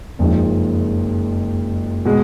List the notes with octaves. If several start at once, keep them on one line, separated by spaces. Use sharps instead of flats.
F#1 F2 F3 G#3 D#4
B2 G#3